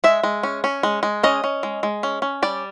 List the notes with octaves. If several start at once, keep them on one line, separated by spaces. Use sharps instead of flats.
G#3 E5
G#3
C#4
C#4
G#3
G#3
C#4 D#5
C#4
G#3
G#3
C#4
C#4
G3 D5